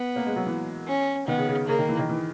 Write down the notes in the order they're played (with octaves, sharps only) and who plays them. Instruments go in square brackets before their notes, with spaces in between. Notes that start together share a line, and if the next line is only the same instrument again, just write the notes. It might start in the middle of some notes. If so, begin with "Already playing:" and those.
Already playing: [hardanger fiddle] B3
[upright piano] A#3
G#3
F#3
E3
[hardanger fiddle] C#4
[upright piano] D#3 [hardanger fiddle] B3
[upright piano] C#3
C#3
[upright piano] C#3 [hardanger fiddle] A#3
[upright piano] D#3
E3
D#3
E3